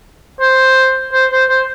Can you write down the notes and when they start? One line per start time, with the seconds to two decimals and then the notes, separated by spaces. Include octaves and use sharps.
0.40 C5
1.13 C5
1.31 C5
1.49 C5